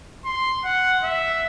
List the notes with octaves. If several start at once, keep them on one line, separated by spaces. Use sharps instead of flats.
C6
F#5
E5